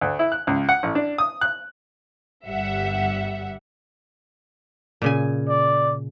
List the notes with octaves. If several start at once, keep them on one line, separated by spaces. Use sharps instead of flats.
D2
E4
F#6
C#2
F#5
A1
D4
D#6
F#6
G1 G3 E5 F#5
A#2 C#3 G#5
D5